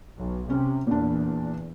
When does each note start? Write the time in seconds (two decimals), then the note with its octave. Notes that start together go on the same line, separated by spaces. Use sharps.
0.17 B1
0.50 C3 C#4
0.87 E2 A#2 D4